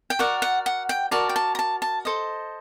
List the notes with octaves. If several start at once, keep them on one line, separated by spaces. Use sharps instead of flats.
G5
F#4 A#4 D5 F#5
F#5
F#5
G5
F#4 A#4 D5 A5
G5
A5
A#5
A5
A5
A4 C5 D#5